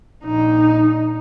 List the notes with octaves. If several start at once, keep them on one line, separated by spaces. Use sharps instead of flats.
A#1 D#4